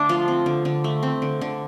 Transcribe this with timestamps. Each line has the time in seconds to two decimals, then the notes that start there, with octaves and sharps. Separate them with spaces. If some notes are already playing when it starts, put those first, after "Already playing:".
Already playing: D3 A3 D4
0.09 F3 F4
0.28 C4
0.46 D3
0.65 D3
0.84 A3
1.03 C4
1.22 D3
1.41 D3